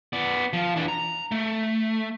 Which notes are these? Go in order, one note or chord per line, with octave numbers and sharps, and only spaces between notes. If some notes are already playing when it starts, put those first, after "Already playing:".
B3 D5
F3
E3 D4
A#5
A3